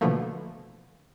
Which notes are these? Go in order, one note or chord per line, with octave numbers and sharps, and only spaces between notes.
B2 D3 E3 F3 A3 A#3